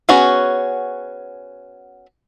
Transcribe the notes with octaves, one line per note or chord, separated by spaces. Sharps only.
B3 C#4 F#4 G#4